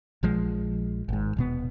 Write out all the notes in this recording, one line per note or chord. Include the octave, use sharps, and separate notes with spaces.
A#1 F3 G#3
G#1 G#2
D#1 B2 B3